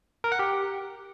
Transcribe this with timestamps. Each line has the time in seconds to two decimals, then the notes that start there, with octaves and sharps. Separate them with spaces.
0.24 A#4
0.32 F#5
0.39 G4